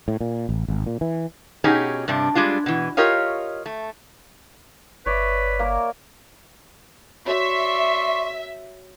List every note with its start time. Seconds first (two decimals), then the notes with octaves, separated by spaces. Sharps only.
0.08 A2
0.21 A#2
0.49 A1
0.68 G#1
0.86 A#2
1.01 E3
1.64 B2 C#4 D#4 G4 G#4
2.08 G2 C3 D4
2.35 G3 G#3 D4 F4
2.66 B2 E3
2.97 F4 G4 A#4 C#5 D#5 F5
3.66 A3
5.06 G1 B4 C#5 D5 E5
5.59 A#3 A#4
7.26 F#4 C#5 D5 E5 C6 C#6